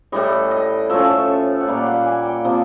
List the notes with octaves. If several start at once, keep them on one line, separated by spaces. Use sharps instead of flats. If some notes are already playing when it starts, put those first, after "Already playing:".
A2 E3 G3 D#5
D#5
F3 A3 C#4 E5
F#5
A#2 G3 A#3 F5
F#5
G#5
G5
C3 F3 A#3